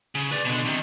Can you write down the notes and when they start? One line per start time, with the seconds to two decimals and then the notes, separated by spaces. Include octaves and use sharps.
0.15 C#3
0.31 B4 D5
0.45 B2 D3
0.65 C3 D#3